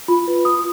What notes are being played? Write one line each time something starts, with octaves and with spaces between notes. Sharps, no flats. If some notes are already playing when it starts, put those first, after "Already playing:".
F4 B5
B4
F4 D#6